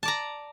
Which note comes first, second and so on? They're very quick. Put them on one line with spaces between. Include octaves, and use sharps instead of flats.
A5 D5 A#5